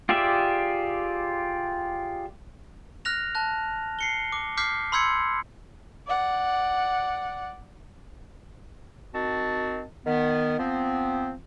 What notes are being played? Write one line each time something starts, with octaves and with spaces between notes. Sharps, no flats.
F4 G4 G#4 D5 E5
F6 F#6 A#6 F7
A5 F#6
C7 C#7 G7
D6
D6 F6 G6 B6 C7
B5 C6 E6 G6 G#6 C#7
D5 F#5
D#3 C4 F#4 A5
D#3 B3
F3 B3 C4